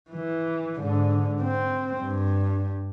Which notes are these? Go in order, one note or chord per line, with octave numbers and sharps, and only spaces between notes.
E3
G#2 D3
C4
G2